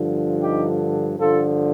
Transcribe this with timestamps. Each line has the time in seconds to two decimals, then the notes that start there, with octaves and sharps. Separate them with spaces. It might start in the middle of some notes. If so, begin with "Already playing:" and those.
Already playing: G2 D3 F3
0.41 D#4 G4
1.18 G2 D3 F3 F4 A4